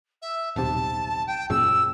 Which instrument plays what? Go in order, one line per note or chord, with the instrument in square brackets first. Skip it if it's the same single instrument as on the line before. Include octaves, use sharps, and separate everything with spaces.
[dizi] E5
[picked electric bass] D#1 B1 C3 [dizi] A5
[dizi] G5
[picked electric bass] F#2 A#2 C#3 [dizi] E6